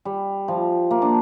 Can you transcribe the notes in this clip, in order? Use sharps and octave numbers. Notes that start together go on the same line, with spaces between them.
G3
F3
A#3
D4